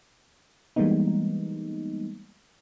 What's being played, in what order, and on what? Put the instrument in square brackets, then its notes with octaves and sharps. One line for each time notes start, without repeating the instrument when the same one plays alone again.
[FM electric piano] E3 G3 G#3 A#3 B3 D#4